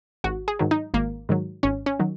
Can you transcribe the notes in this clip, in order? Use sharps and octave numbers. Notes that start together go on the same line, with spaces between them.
G#1 F#4
G#4
G#2 D#3 F#3
D#4
G#1 A#3
G#2 D#3 F#3
G#1 C#4
C#4
D#3 F#3